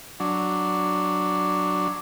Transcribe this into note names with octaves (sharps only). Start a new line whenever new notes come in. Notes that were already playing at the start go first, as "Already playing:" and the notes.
F#3 D4